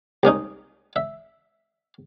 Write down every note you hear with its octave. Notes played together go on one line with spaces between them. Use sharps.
C2 A#3 C#4 D#4
E5